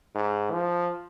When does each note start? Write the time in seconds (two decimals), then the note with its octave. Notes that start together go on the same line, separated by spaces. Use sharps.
0.15 G#2
0.52 F3